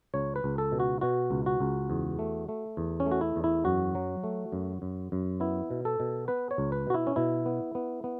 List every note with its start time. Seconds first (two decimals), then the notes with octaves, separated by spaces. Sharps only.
0.14 C#2 C#5
0.36 B4
0.44 C#2
0.58 A4
0.72 B2
0.80 F#4
1.01 B2 F#4
1.31 C#2
1.46 F#4
1.60 C#2
1.90 E2
2.19 A3
2.49 A3
2.77 E2
3.00 C#4
3.06 A3
3.11 F#4
3.21 E4
3.36 E2
3.44 E4
3.65 F#2 F#4
3.95 F#3
4.23 A3
4.52 F#2
4.82 F#2
5.12 F#2
5.40 B3 E4
5.71 B2
5.85 A4
6.00 B2
6.28 B3 B4
6.51 C#5
6.58 C#2
6.72 B4
6.87 B2 F#4
6.94 E4
7.07 C#4
7.16 B2 E4
7.46 B3
7.75 B3
8.04 B3